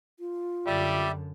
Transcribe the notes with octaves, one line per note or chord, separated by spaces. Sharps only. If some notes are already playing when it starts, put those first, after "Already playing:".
F4
F#2 D3 G3 D5 E5